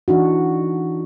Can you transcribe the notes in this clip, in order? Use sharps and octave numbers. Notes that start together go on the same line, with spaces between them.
E3 D4 D#4 F#4